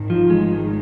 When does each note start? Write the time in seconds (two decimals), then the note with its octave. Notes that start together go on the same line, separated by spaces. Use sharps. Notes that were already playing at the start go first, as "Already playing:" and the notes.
Already playing: G#1 G#2 D#3
0.10 F3
0.30 G#3